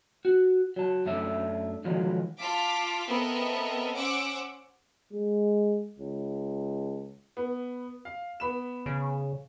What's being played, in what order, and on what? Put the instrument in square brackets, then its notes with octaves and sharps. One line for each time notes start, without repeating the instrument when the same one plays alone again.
[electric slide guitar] F#4
F#3 A5
F#2 A3 D4 E5
D3 D#3 F3 F#3 G#3
[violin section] F4 F5 A5 D6 B6
B3 C4 A4 A#4 D#5 E5
C#4 C5 F#5 C#6 D6 E6
[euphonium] G#3
C#2
[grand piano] B3
F5
B3 B5 E7
[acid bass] C#3